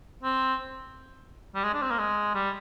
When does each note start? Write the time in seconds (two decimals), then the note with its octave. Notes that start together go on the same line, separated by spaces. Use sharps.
0.23 C4
1.55 G3
1.64 G#3
1.73 D4
1.82 C4
1.91 A#3
1.99 G#3
2.34 G3